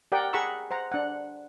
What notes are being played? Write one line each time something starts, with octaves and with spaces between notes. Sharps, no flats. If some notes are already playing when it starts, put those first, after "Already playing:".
G4 A#4 D5 F#5 G5
G#4 F#5 A#5 B5 C#6 E6
C5 F#5 A#5
D4 F#5